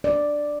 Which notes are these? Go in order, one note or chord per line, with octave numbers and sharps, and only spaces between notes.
D5